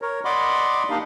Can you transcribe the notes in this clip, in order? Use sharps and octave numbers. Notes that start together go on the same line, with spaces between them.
A#4 C#5
D5 D#5 F#5 B5 C6 D6
A#3 D4 D#4 G4 D#5 F5